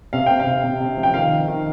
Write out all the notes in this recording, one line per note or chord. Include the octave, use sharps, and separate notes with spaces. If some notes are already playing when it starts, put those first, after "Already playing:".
C3 F5
C3 G5
F5
C3
C3
C3
F3
G5
D#3 F5
D#3
D#3